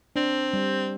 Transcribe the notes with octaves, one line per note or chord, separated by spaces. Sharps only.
C4 D4
G3